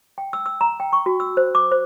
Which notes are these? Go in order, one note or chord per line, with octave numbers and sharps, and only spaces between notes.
G5
E6
E6
A#5
G5
C#6
F#4
E6
C5
D6
C5